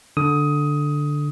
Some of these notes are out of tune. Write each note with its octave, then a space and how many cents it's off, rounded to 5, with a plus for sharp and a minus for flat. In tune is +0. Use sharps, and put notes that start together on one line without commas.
D3 +0 D#6 +15